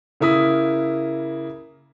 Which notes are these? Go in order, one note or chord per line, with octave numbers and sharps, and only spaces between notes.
C#3 A#3 E4 D#6 B6